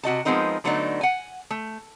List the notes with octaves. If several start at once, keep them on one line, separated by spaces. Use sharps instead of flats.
C3 F#4 D#5 A5
F3 G#3 B3 C4 D#4 A#4
D3 F#3 A3 B3 D4 D#4
F#5 G#5
A3